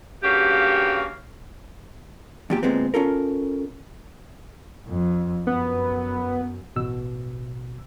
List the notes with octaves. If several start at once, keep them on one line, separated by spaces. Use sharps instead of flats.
G2 C#3 A#3 F#4 G4
E2 A#2 G4
D2 A#2 G#3 B3 C4
C#4 F4 A4 A#4
F2
F#2 B3
A1 B2 E6